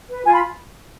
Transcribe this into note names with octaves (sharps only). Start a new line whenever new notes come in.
B4
F4 G#5
B5